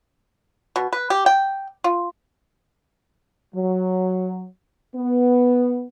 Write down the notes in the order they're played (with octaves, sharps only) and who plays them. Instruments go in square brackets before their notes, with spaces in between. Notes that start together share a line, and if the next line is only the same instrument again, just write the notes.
[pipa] B2
B4
G4
G5
F4
[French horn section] F#3
B3